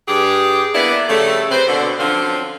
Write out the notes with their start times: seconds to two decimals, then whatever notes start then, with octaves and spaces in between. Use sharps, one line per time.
0.08 G2 G4 G#4
0.75 A#3 B3 D4 E4 D5
1.09 C#3 F3 G3 A3
1.51 C3 C4 B4 C5
1.68 B2 D3
2.00 D3 F3 F#3 C4 C#4 F4